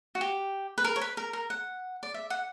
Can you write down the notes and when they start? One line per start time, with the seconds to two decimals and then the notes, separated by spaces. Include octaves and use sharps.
0.15 F#4
0.21 G4
0.78 B4
0.85 A#4
0.96 C#5
1.01 B4
1.17 A#4
1.33 A#4
1.50 F#5
2.03 D5
2.14 E5
2.30 F#5